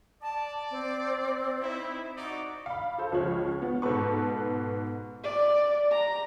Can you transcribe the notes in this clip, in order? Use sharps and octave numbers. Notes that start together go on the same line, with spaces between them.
D5 A5
C4
D#4 E4
D#4 F#4 D5
F5 B5
A4 C5
C#2 F3 G#3 C#5 F6
B3
G#2 B2 A4 B4 C#6
D5
A#5